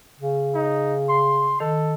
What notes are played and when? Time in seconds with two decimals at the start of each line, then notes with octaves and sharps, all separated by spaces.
0.20 C#3
0.55 D#4
1.09 C6
1.60 D#3 A4